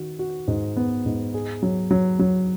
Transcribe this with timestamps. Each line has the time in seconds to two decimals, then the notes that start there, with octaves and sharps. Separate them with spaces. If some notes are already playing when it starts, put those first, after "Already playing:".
Already playing: D#3 F#4
0.19 F#4
0.48 G#2
0.77 B3
1.06 G#2
1.34 G#4
1.63 F#3
1.91 F#3
2.19 F#3